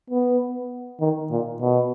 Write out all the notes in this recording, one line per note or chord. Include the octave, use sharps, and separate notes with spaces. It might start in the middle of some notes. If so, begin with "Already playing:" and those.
B3
D#3
A#2
B2